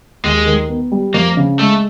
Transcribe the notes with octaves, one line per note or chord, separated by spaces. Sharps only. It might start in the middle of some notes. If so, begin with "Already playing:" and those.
D#2 G#3
D#3
B3
G3
F2 A#3
C#3
G#3 A3